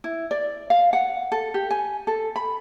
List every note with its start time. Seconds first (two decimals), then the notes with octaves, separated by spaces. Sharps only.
0.04 E4
0.31 D5
0.70 F5
0.93 F#5
1.32 A4
1.54 G4
1.71 G#5
2.07 A4
2.36 B5